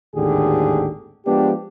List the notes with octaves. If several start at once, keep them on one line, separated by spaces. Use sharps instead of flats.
G#1 D#2 A2 D3 G4 G#4
F3 G#3 B3 D4 G4